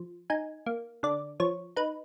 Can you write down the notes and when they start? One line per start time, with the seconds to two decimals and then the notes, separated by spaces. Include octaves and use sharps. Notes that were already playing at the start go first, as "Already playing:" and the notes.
Already playing: F3
0.30 D#4 G#5
0.66 A#3
1.03 D3 D5
1.40 F3 C#5
1.76 D#4 B4